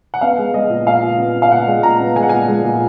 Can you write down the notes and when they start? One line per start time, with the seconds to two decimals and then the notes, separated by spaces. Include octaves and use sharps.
0.14 F#5
0.21 B3 F5
0.38 G#3
0.54 G#3 D#5
0.70 A#2
0.86 A#2 F5
1.02 A#2
1.18 B3
1.35 B3
1.42 F5
1.52 A#2 F#5
1.67 G#3
1.83 A#2 A#5
2.00 B3
2.16 G#3 G#5
2.23 F#5
2.29 A#2 G#5
2.48 G#3
2.64 A#2